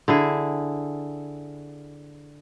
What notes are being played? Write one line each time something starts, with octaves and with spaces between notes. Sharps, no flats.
D3 E4 G#4